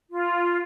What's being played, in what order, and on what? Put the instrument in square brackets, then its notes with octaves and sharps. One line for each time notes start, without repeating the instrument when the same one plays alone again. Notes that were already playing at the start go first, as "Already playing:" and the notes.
[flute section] F4